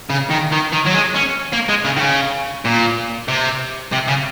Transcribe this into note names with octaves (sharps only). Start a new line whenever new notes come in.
C#3
D#3
D#3
D#3
F#3
G#3
C#4
A#3
G#3
C#3
D#3
C#3
A#2
C3
C3
C#3